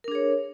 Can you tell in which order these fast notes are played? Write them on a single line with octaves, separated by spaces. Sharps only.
A#4 D4 G#4 C#5